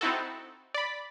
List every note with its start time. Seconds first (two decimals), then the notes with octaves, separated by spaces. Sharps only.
0.01 C4 D#4 E4 F#4 A4
0.74 D5 B5